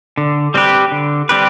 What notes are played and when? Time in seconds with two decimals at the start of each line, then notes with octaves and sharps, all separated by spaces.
0.18 D3
0.54 G3 C4 G4 B4
0.92 D3
1.29 G3 C4 G4 B4